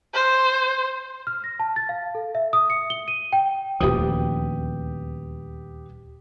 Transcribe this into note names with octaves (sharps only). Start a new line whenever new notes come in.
C5
F6
A#6
A5
A6
F5
A4
E5
D#6
C#7
G7
D#7
G5
D#1 D2 F3 G4 B4 D#6